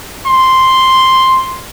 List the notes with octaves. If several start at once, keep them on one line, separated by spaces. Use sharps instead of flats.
C6